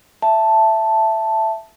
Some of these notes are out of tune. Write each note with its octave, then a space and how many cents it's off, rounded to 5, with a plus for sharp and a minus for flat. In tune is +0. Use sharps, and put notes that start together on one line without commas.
E5 +10 A5 +0